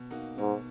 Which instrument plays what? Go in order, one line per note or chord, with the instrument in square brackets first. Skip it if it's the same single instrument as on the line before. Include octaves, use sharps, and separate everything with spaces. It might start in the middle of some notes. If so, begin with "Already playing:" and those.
Already playing: [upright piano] B2
A#3 D#4 F#4
[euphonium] G#2 [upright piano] B2